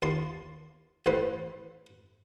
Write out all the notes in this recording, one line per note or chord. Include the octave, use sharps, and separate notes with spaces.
D#2 F4 A5 C6
A1 A2 B4 C5 E5